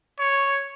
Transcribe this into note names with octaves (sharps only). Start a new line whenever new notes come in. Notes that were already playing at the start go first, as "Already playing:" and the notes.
C#5